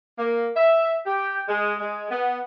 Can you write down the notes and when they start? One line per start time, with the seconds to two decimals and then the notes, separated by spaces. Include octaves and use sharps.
0.18 A#3
0.55 E5
1.06 G4
1.48 G#3
1.79 G#3
2.10 B3